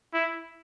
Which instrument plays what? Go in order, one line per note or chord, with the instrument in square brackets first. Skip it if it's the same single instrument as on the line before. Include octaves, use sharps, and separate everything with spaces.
[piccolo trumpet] E4